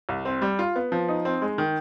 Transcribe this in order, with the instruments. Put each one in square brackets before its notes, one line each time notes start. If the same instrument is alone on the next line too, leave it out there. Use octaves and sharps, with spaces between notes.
[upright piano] C2
C4
G3
F4
B3
F3
D#4
C4
G#3
D#3